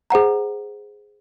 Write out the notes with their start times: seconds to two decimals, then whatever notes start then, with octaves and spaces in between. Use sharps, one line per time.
0.10 G#4 C5 F#5 A#5